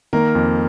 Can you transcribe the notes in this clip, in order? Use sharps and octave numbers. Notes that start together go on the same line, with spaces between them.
D#3 A#3 A#4
F2